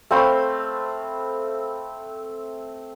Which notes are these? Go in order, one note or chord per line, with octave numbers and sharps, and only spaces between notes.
A3 C4 F5 B5